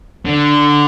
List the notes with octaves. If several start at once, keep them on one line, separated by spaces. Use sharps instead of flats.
D3